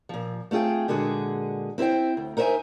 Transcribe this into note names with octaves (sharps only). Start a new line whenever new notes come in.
A#2 F3
A3 C4 F4 G#4 G5
A#2 D3 G#3 F#4 G#4
C4 E4 G#4 C5 G5
D2
D#4 A#4 C5 C#5 E5 G#5